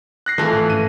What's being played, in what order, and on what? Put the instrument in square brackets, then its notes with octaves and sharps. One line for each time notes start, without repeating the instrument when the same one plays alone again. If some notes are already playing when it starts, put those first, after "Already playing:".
[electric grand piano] F#6 A#6 C7
[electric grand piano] F2 [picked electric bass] D#3 [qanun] E3 A3 F5
[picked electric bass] G#1 A2
[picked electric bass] G#2 C#4 [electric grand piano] D#7